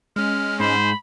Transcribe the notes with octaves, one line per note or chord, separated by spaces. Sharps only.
G#3 C#4 F6
G#2 C5 B5